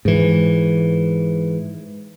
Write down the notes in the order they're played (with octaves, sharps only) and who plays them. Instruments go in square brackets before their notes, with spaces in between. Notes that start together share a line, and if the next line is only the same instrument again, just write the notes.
[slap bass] G#2 E3